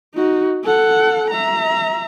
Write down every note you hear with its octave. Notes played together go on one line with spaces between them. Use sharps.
D#4 F#4
A4 F#5
E5 A#5